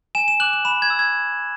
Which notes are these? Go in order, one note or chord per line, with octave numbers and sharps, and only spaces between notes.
G#5 E7
E7
D6 F#6 F#7
F#7
B5 E7
G#6
E6
G#6